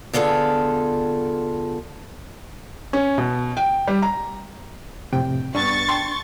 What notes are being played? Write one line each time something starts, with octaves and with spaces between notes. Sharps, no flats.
D3 B3 F4 G#4 A4
C#4
B2
G5
G3
A#5
F2 A2 C3 G5
G2 B3 D4 C#6 A6
G5 A5 C6